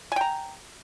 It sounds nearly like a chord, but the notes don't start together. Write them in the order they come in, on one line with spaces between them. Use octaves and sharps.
G#5 G5 A#5